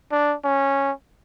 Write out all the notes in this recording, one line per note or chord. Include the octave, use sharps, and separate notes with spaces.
D4
C#4